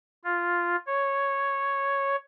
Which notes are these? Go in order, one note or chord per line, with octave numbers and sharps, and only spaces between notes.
F4
C#5